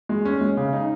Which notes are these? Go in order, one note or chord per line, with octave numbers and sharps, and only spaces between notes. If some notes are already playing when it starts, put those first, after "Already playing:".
G#3
C#4
G#3
C#3
D#4